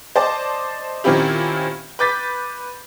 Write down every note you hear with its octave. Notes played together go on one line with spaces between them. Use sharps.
C5 D5 D#5 A5 D6
A#2 D#3 C4 C#4 E4 G4
B4 D6 G6 A6 B6